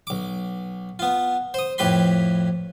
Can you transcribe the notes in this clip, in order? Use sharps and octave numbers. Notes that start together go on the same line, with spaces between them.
B1 D6
B3 F4
C5 D#6
F2 A2 G4 B4 B5 C6